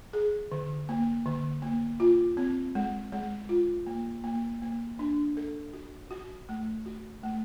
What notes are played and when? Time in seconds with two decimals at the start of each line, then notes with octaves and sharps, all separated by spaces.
0.13 G#4
0.52 D3
0.89 A#3
1.26 D3
1.62 A#3
2.00 F4
2.37 C4
2.75 G#3
3.12 G#3
3.49 F4
3.87 A#3
4.24 A#3
4.62 A#3
4.99 D4
5.37 A4
5.73 F#4
6.11 F#4
6.49 A3
6.86 F#4
7.23 A3